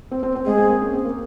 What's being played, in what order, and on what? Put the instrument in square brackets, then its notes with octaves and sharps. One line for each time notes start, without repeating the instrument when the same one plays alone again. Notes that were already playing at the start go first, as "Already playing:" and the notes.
[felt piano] C4
C4
C4
[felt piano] G#3 [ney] G#4
[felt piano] C4
A#3
C#4
C4
A#3